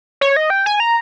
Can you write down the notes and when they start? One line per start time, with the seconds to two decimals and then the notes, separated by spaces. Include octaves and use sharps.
0.21 C#5
0.36 D#5
0.50 G5
0.66 G#5
0.80 A#5